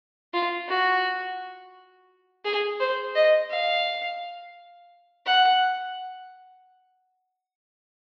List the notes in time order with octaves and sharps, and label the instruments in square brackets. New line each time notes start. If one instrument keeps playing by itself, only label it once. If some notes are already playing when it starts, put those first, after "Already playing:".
[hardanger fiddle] F4
F#4
G#4
C5
D#5
F5
F#5